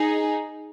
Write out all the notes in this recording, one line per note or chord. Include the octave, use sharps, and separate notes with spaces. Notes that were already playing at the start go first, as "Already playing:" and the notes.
Already playing: D#4 G#4